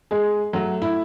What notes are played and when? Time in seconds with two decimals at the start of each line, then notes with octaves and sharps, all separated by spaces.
0.11 G#3 G#4
0.53 F#3 A3 F#4
0.82 E4